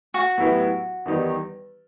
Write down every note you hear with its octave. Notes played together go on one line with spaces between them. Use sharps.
F#4
A2 F#3 B3 E4 G4
E2 D#3 G3 D#4 G4